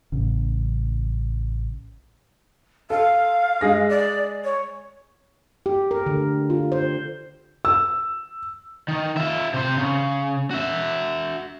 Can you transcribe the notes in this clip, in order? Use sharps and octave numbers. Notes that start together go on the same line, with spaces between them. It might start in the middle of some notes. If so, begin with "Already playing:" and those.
A1 C#3
A4 F5
G#3 G#4 A#6
D5
C#5
G4
A#4
D3
F4
C5
E6
D#3
F4 E5
C3 C5
C#3
F#4 E5